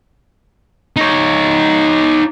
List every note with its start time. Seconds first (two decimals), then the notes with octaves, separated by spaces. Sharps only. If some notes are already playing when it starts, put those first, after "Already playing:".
0.96 D#4 C#5